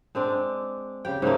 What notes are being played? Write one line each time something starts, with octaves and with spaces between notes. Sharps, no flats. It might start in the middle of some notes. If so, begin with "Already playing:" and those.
G#3 C4 D4 D5
C#3 G4 G5
G#2 C#3 A3 A#3